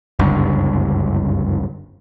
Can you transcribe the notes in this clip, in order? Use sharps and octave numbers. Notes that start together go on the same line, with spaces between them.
F#1 C#2 G2 D3